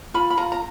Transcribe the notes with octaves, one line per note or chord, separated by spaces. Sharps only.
F4 B5
B5
F4 A#5
A#5